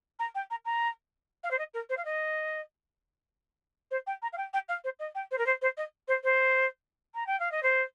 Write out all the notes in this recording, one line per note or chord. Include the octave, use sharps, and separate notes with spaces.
A#5
G5
A#5
A#5
F5
C5
D#5
A#4
C5
F5
D#5
C5
G5
A#5
F5
G5
G5
F5
C5
D#5
G5
C5
A#4
C5
C5
D#5
C5
C5
A#5
G5
F5
D#5
C5